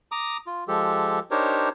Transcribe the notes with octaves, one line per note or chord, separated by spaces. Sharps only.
A#5 D6 D#6
F4
F3 G#3 G4 A4
D4 D#4 G4 A#4 C5 C#5